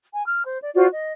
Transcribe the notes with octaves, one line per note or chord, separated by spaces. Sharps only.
G#5
F6
C5
D5
F4 F#4 C5 D5
D#5